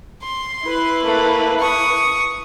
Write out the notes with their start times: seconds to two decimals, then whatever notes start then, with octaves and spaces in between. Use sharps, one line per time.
0.23 C6
0.64 E4 B4
1.03 A3 A#3
1.60 C#6 D#6